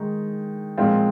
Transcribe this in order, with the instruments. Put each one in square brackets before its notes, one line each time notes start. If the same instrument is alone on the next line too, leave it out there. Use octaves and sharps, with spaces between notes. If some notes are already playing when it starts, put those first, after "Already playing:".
Already playing: [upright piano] D#3 G#3 D#4
A#2 F3 G#3 C4 F4